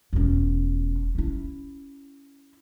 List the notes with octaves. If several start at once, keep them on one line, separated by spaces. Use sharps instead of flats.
E1 C#4
C#4 E4